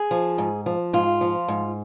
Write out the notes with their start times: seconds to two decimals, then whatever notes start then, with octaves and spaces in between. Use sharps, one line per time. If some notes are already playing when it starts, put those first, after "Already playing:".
Already playing: G#4
0.11 F3
0.38 G#2
0.66 F3
0.93 G#2 F4
1.21 F3
1.48 G#2